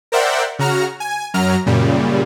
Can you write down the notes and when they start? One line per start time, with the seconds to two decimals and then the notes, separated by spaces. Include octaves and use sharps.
0.12 A#4 C5 D5 E5 F#5 G5
0.59 C#3 F#4 A#5 F6
1.00 G#5
1.34 F#2 F#3 A#5 F6
1.66 F#2 A#2 C#3 G3